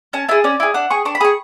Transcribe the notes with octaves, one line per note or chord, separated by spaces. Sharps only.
C#4 A5
E4 G#4 A5
C#4 D5
E4 G#4
D4 F#5
G#4 C#6
D4 C#6
B5
G#4 C#6